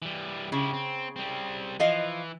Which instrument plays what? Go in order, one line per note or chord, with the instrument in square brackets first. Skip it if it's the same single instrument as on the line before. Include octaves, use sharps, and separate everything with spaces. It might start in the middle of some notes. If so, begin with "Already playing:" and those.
[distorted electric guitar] E3 G3
[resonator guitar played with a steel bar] C#3 [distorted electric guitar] E4 G4
[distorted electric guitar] C4
G3 C4
[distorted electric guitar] E3 [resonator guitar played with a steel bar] F3 D#5 F5